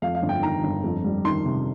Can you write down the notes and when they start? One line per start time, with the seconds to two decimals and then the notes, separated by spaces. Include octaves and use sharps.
0.02 F2 F5
0.15 F5
0.22 G1
0.29 G5
0.42 D#3 A#5
0.63 G1
0.84 F2
1.04 G3
1.24 D#3 C6
1.46 C3